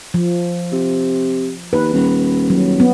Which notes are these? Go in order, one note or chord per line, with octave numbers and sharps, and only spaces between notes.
F3
C3
D#2 B4
D#1
F#3
B3